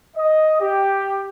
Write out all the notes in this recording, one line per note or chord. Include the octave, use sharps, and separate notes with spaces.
D#5
G4